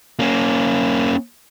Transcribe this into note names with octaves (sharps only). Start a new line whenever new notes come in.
A#3 C#4